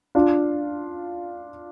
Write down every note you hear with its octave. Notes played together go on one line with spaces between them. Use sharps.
D4 F4